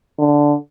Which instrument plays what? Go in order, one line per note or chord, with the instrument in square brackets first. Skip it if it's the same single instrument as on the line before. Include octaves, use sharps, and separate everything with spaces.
[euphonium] D3